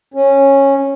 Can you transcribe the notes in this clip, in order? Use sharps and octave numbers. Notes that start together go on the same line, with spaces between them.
C#4